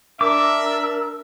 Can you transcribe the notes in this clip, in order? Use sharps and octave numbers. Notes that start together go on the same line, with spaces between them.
D4 A#4 E5 D6 E6